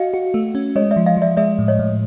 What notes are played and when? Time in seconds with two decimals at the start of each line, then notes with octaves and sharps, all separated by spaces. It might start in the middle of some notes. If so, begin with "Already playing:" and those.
Already playing: F#4 D#5 F5
0.14 F#4
0.34 A3
0.55 C#4
0.76 G#3 C#5 D#5
0.91 D5 E5
0.96 F3
1.06 D#5 F5
1.17 F3 D5 E5
1.37 G#3 D5 E5
1.59 A2
1.68 C#5 D#5
1.79 A2